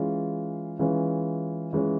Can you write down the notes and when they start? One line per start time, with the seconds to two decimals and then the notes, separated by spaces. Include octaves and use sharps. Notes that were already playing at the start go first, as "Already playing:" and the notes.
Already playing: E3 G#3 C#4 F4
0.79 E3 G#3 C#4 F4
1.73 E3 G#3 C#4 F4